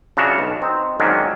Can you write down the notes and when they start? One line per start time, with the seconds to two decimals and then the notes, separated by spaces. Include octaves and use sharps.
0.17 C#3 F3 D4 F#4 E5 A#5
0.39 B1
0.62 C4 D#4
1.00 G#2 D#3 F#3 A#3 C#4 D4